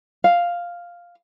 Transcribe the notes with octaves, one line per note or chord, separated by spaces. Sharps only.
F5